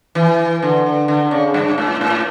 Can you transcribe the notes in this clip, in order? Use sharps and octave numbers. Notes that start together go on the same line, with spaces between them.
E3
D3
D3
C#3
G2
A2
A2